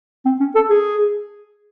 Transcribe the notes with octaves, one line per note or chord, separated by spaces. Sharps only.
C4
C#4
A4
G#4